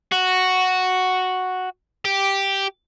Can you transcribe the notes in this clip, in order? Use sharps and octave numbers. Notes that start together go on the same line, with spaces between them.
F#4
G4